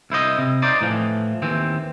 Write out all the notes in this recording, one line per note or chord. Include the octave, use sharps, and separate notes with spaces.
C2 E4 C5 D#5
C3
D#4 C5 D5
A2 E3 F3
D#2 E3 C4